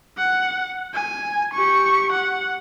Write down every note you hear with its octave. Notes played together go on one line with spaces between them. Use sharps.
F#5
G#5
G4 C#6
F#5